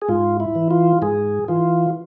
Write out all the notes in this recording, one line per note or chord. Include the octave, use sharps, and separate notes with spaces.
G#4
G#2 F4
E4
E3
F4
G#2 G#4
E3 F4